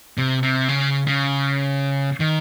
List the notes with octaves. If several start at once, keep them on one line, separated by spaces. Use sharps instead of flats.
C3
C3
C#3
C#3
D#3